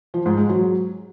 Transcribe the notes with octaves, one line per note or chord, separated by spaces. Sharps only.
F3
G#2
G#3
F#3